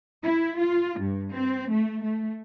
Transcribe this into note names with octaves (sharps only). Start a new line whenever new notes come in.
E4
F4
G2
C4
A3
A3